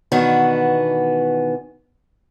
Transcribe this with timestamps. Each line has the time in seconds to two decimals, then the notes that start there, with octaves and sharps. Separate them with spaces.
0.12 B2 D#3 E3 B3 D4 F#4